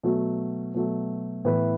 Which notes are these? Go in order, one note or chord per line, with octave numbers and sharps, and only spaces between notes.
B2 F#3 A3
B2 F#3 A3
A2 E3 B3 E4 B4